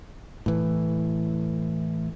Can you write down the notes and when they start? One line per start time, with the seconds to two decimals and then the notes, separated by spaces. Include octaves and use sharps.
0.46 A2 E3